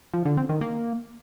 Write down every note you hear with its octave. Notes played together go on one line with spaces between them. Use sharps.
F3
D3
C4
D#3
A#3